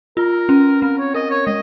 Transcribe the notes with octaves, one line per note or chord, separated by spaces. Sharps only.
F4 A#4
C#4
C4 A#4
C#5
A#4 D#5
C#5
G#3 D#5